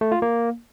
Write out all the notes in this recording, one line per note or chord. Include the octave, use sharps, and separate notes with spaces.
A3
F4
A#3